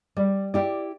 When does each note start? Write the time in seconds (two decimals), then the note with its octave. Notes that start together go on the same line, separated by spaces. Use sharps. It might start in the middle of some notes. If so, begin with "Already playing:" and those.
0.17 G3 D5
0.54 E4 G4 D5